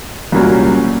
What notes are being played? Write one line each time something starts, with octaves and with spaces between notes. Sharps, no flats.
C2 A#2 F#3 A#3 C#4